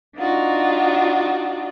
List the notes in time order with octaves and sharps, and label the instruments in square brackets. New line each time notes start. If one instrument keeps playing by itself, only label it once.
[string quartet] D4 D#4 F4 F#4